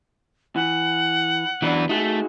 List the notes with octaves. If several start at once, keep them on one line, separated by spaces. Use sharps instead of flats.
E3 F#5
F#2 E3 F#3 B3 D4
A3 D#4 F#4 G#4